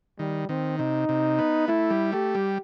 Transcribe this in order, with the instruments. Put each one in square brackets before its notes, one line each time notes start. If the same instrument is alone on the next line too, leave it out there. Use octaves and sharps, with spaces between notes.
[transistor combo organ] D#3 [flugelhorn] G3
[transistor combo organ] D#3 [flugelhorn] C4
[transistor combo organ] C3 [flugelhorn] D#4
[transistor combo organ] C3
B3
[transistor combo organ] A3 [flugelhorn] E4
[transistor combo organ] G3
[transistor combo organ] A3 [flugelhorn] G4
[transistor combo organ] G3